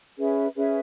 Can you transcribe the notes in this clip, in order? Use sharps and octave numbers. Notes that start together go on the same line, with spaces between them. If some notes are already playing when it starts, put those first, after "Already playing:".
C#4 G#4 B4 E5
C#4 G#4 B4 E5